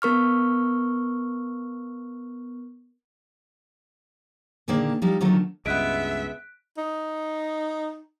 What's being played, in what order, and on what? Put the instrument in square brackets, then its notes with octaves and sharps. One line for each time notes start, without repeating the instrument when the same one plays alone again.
[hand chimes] B3 A#4 C#6 F6
[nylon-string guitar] A#2 D3 D#3 A#3 G#4 D5
F3 G3 D#4 E4
D3 D#3 F#3 A3 F4 A4
[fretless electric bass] C#2 G2 [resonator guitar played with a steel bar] G#3 B3 [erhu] E5 [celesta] F#6 B6 D7
[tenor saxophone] D#4